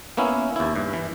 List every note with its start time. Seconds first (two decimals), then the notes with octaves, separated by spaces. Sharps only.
0.17 A#3 B3 C#4 E4
0.56 D#2 E4
0.76 G2
0.93 E3